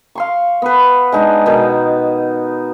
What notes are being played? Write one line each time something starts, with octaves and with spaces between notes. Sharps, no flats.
F5 C6 C#6
B3 B4
G#3 D4 D#4
B2 D#3 F#4